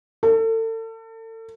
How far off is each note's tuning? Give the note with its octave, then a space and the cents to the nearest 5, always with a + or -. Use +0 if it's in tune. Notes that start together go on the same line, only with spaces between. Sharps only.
A4 +35